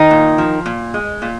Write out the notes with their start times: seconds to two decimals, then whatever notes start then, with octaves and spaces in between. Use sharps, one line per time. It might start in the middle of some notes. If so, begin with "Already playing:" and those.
Already playing: D#3 D#4
0.11 A#2
0.38 F3
0.66 A#2
0.94 G#3
1.22 A#2